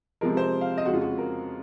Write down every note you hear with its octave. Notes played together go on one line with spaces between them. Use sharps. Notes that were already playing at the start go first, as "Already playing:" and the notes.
C3 F3 G#3 A#4
C5
F5
D#5
F2 C#3 G#3 F#4
F4
F#4
A#4